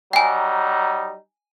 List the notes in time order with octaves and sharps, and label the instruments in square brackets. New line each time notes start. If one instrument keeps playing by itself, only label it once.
[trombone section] F#3 G3 D#4 [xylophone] G5 G#5